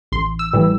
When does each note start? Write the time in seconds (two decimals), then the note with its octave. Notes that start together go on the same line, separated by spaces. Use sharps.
0.12 A1 C6
0.39 E6
0.53 A2 E3 G3